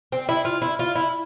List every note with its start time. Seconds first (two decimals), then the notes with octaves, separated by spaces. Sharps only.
0.12 C4
0.29 E4
0.45 F4
0.62 E4
0.79 F4
0.95 E4